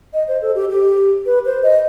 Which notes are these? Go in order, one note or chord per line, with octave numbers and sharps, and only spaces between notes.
D#5
C5
A4
G4
G4
B4
C5
D#5